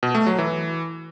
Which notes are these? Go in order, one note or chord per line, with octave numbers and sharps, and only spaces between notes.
B2
A3
F#3
E3